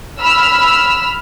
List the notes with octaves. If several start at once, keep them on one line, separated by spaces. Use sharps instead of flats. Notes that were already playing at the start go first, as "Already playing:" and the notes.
B5 E6 F6